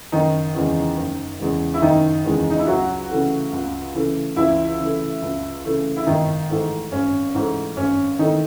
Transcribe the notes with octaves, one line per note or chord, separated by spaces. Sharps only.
F#1 D#3 D#4
E2 C#3 E3 G#3
F#1
E2 C#3 E3 G#3
E4
F#1 D#3 D#4
E2 C#3 E3 G#3
D#4
E4
C#2 F#3 F#4
C#3 E3 A3
C#2
C#3 E3 A3
C#2 E3 E4
C#3 E3 A3
C#2
C#3 E3 A3
E4
G#1 D#3 D#4
G#2 E3 A3
G#1 C#4
G#2 E3 A3
G#1 C#4
D#3 E3 A3 D#4